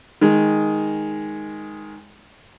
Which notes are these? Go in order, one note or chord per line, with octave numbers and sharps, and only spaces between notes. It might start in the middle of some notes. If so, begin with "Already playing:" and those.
D#3 G#3